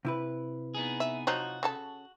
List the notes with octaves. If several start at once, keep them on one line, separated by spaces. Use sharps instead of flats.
C3 E4 B4
B3 D#4 G#4
E5
F3 F#3 D#4 F#4
C#3 A4 A5